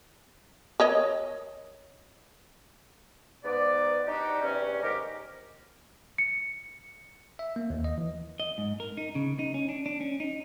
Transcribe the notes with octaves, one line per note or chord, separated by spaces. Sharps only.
A#4 C#5 D#5
G#2 B3 D5
D4 D#4 F#4 G4
E2 G2 C3 G3 C#4
D#2 G#2 G4 A#4
C#7
E5
A#3
D#2
D#5
E3
D#5
G#2
A#4
D#4
C#3
D#4
C#4
D4
D4
C#4
D#4